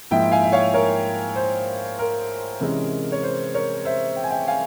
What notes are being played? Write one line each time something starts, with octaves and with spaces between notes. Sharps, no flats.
G#2 F3 A#3 E4 E5 G5
F5 G#5
E5
C#5 F5
A#4 C#5
C5
A#4
C3 E3 G#3 C#4
C#5
C5
A#4 C#5
C5 E5
G5
G#5
E5 G5
F5 G#5